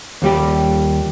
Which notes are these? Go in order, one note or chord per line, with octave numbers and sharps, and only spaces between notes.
D#2 G3 G4